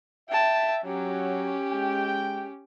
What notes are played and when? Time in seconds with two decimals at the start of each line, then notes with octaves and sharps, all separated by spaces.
0.30 E5 G5 A5
0.84 F#3 C#4 G4
1.73 G#3 G5